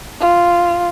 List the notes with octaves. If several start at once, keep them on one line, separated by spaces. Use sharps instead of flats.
F4